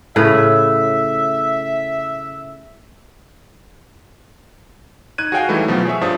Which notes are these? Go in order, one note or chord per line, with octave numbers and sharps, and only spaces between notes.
A2 C#3 B4 E5
D#4 F#6 G#6 D#7
F#4 G#4 C#5 F5 G5 G#5
E3 G3 A3 D#4 E4
B2 F3 F#3
G#4 C#5 E5
G2 F3 D4 D#6